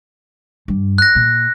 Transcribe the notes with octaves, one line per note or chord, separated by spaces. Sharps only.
G2
F#6 A#6
A#2